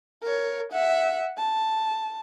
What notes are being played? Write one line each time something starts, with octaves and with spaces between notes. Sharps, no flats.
A#4 C#5
E5 F#5
A5